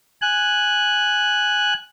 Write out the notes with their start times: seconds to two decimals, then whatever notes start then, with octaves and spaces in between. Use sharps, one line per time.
0.22 G#5 F#6